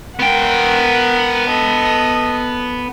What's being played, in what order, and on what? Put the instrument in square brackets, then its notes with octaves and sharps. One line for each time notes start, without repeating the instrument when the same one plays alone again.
[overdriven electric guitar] B3 G5 [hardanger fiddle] A#4 F#5
[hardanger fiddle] A4 D#5